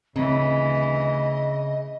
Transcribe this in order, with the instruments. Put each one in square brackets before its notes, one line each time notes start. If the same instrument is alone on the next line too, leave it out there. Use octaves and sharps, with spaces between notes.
[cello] D2 E3 [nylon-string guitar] C#3 [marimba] C4 [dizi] D#5